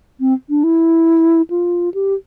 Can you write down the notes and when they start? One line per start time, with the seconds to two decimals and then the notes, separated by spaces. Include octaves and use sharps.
0.20 C4
0.50 D4
0.64 E4
1.50 F4
1.94 G4